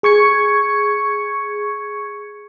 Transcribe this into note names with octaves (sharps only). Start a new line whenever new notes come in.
G#4 C#6 G#6 C#7